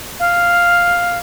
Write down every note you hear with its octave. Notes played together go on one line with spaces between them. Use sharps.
F5